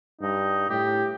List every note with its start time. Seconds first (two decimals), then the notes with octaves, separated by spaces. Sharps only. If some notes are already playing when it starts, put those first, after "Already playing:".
0.21 G2 D#4
0.70 A2 G4